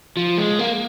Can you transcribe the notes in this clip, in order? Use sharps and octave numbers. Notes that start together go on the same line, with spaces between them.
F3
G#3
A#3